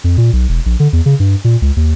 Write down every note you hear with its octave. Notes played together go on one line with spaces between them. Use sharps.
F2
A#2
B1
E1
A#1
D3
E2
C#3
G2
A#2
C#2
D#2